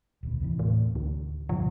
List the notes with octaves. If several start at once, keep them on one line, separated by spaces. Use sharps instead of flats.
D#1 D2 B2
D#2 C3 E3
A2
D2
G2 B2 D3 F3